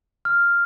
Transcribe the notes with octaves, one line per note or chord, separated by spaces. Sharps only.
F6